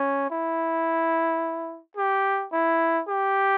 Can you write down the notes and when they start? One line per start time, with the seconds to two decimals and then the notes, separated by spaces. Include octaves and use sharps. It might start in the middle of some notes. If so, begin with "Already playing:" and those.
Already playing: C#4
0.30 E4
1.97 G4
2.52 E4
3.08 G4